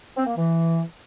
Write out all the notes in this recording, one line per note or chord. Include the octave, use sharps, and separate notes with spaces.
C4
A#3
E3